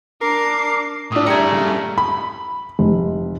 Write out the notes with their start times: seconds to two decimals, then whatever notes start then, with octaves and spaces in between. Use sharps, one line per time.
0.22 D4 A#4 D6 C7
1.12 A2 D4 D#6
1.26 G3 A3 D4 G4 G#4 A#5 C#7
1.52 G2 C#3
1.98 B5
2.79 F1